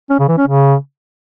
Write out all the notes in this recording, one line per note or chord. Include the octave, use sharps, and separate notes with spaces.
C#4
C#3
E3
C#4
C#3